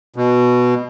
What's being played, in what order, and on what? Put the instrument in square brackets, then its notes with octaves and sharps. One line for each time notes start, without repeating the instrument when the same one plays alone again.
[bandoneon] B2